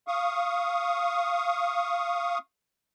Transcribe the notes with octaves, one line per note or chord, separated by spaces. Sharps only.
F5 C#6 D#6